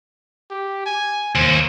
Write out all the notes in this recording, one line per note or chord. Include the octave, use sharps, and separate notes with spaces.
G4
G#5
D#2 C5